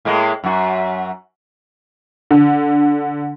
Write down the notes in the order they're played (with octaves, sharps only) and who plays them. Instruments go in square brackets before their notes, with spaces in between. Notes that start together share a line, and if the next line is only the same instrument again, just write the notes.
[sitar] A2 G#3 A#3
F#2 F#4
[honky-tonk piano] D3